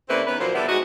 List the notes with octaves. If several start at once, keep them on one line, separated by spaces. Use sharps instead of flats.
C#3 A#3 C4 E4 B4 D5
D#3 B3 C#4 B4
A#2 F3 F#3 A#3 C5
D3 G3 B3 E4 A4
G#3 D#4 F#4 D#5 F#5